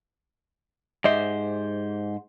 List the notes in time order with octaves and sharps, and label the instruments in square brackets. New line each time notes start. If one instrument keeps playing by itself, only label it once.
[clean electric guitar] G#2 C5 [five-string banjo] G4 D#5 E5